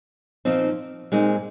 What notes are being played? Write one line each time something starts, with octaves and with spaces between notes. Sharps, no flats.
A#2 F3 C4 D#4
A#2 G#3 C4 D#4